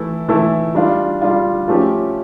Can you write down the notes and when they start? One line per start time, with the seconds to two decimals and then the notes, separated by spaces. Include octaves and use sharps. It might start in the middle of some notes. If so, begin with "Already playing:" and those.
Already playing: E3 A3 E4 A4
0.28 E3 A3 E4 A4
0.75 G3 D4 F4
1.22 G3 D4 F4
1.68 F3 A3 C#4 G4